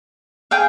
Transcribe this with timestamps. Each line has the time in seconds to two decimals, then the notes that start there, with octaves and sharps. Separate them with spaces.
0.51 G#4 F5 G5